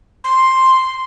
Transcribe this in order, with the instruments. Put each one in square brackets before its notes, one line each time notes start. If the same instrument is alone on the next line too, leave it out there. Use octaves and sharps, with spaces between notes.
[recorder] C6